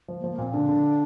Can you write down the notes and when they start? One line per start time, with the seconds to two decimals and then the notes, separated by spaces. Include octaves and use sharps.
0.08 F3
0.20 A#3
0.24 F3
0.31 A#3
0.38 A#2 C4
0.54 D3 D4
0.69 D3